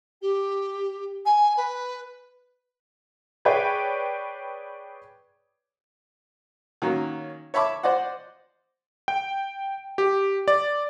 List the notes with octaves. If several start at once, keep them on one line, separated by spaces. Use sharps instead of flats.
G4
G#5
B4
G#4 B4 C#5 D5 G5
D#3 F#3 A#3 C#4
C#5 E5 A5 B5 C#6 D6
C5 D5 D#5 F#5
G5
G4
D5